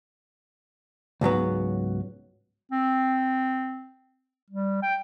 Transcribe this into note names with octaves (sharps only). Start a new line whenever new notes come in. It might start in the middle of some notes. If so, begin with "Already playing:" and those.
C#2 G#2 F#3 B3
C4
G3
G5